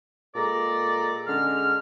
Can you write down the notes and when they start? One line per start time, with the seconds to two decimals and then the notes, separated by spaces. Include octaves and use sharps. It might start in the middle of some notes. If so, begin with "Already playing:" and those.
0.35 A#2 G#3 A4 D5 A#5
1.27 D3 G#3 C#4 F6